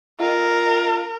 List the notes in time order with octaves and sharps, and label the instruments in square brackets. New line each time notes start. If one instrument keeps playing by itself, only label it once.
[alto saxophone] F4 [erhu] A#4